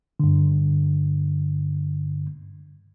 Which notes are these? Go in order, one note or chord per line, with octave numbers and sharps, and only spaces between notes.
G2 D3